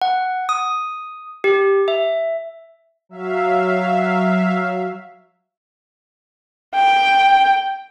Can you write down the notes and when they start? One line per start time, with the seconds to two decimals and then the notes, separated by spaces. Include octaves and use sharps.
0.02 F#5
0.49 D#6
1.44 G4
1.88 E5
3.09 F#3 E5 F5
6.75 G5